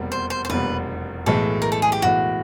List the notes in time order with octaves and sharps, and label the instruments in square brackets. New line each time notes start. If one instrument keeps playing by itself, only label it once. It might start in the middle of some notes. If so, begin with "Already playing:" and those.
Already playing: [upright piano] F1 E2 B2 G3 A#3
[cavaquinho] C5
C5
C5
[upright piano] F1 E2 B2 G3 A#3 [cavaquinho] B4
[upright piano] B1 A2 E3 G#3 [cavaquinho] A4
[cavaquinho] A#4
A4
G#4
G4
[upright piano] B1 A2 E3 G#3 [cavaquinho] F#4